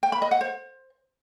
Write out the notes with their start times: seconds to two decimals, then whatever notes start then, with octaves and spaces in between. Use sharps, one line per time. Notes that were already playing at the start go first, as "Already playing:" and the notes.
0.03 G5
0.12 B5
0.22 D#5
0.31 F#5
0.41 C5